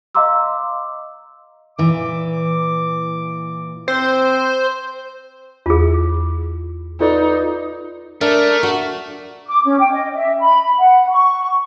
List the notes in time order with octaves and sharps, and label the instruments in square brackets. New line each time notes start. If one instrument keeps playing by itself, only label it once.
[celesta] D#5 F5 A#5 C6 D6 E6
[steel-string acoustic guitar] A#2 E3 [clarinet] D6
[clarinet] C4 [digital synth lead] C5
[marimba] E2 [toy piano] F4 G#4
[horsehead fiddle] D#4 [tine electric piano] F4 B4 D5 [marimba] A4
[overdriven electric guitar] A3 [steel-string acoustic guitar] D4 [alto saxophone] A#4
[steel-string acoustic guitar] F#4
[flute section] D6
C#4
G5
D#5
E5
B5
F#5
C#6